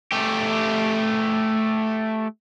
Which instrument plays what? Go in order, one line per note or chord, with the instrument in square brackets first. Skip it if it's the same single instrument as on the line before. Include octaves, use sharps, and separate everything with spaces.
[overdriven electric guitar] A3 G4